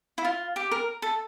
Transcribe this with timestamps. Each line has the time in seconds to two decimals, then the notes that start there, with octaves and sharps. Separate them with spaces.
0.18 E4
0.24 F4
0.56 G4
0.71 A#4
1.02 A4